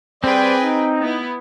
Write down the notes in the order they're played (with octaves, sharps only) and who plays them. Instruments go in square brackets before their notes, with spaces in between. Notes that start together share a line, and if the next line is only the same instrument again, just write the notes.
[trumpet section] G3 C5 D5 [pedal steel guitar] C4 [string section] G#4 B4 G5
[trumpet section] D#4
[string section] B3 E4